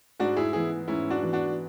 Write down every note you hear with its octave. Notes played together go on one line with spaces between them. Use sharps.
G#2 D4 F#4
E4 G#4
E3 B3 E4 G#4
G#2 C#4 E4
D4 F#4
E3 B3
D4 F#4